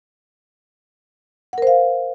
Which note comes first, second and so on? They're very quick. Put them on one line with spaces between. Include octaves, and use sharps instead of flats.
F#5 A#4 C5 F5